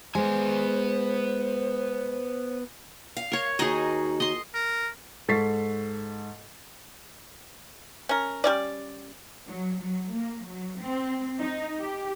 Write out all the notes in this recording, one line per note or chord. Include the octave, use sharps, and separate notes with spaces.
G#3 B3 C5 G#5
F5
A#4 C#5
D#2 D#4 F#4 G#4 D#5
D#5 C6
A#4
G#2 A4 C#6 A6 B6 C7
C#4 A#4
G3 C#4 D5
F#3
F#3
A#3
F#3
C4
D#4
G4